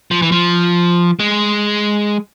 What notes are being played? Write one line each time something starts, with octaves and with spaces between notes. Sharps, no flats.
F3
E3
F3
G#3